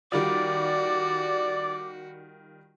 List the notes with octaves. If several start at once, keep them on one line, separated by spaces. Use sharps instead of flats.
D#3 G3 F4 F#4 D5 D6